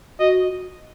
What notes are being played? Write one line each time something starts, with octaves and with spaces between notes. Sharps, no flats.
F#4 D#5